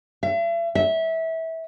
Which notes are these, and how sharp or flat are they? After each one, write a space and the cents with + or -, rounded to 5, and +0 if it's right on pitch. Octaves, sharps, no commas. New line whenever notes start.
E5 +40
E5 -20